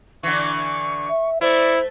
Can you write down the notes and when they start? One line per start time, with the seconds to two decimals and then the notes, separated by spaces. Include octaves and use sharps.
0.23 D3 E3 C#6
1.09 E5
1.41 A3 E4 C5 D5